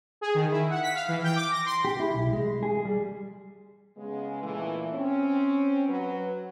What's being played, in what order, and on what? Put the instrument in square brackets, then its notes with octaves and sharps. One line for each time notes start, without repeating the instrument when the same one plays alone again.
[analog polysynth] G#4
D#3
E4
F#5
B6
F5
E3
G5
D6
A#6
C6
[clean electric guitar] G4
E4
B1
G#3
G#4
G3
[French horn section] C#3 G#3 B3
A#2 E3 A3
C4 C#4
F#3 B4